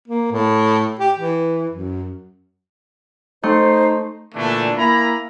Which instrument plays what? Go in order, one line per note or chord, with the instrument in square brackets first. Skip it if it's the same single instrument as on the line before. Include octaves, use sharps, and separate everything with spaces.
[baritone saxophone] A#3
A2
G4
E3
F#2
[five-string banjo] A3 [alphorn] D#4 [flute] C5
[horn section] A#2 D3 E3 A3 D4
A#3 E4 G#5 A#5 B5